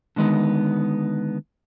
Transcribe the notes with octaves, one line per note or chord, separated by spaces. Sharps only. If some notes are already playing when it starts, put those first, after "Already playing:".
D3 D#3 G#3 B3 D#4